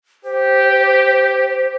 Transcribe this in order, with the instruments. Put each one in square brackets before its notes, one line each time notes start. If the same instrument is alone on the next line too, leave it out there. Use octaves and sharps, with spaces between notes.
[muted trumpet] G4 [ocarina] C5